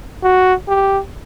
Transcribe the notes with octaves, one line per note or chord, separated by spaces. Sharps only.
F#4
G4